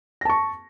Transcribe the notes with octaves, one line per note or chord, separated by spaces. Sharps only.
A5 C#6 A#6